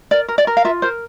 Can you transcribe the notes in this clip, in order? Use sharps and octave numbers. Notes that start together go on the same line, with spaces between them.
A#4 D5
A#4
D5
A#4
F5
F4 E5
A#4 C5